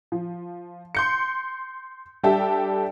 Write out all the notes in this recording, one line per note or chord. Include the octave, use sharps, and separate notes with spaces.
F3
C6 G6 C#7
G3 D4 G4 A4 E5 G5